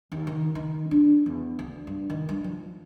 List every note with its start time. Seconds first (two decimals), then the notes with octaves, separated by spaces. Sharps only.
0.12 D#2
0.27 D#3
0.55 D#3
0.91 D4
1.26 E2
1.59 D2
1.87 G2
2.10 D#3
2.29 G2
2.44 F3